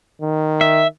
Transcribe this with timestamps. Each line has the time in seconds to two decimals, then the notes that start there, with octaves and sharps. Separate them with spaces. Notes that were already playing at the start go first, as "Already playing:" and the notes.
0.21 D#3
0.61 E5